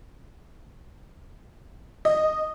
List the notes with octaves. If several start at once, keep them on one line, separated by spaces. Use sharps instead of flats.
D#5